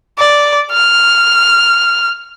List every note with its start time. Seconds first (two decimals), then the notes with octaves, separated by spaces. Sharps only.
0.19 D5
0.72 F6